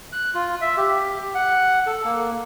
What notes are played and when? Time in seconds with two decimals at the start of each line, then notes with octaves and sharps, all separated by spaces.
0.12 F#6
0.35 F4
0.61 E5
0.77 G4
1.35 F#5
1.87 A4
2.04 A#3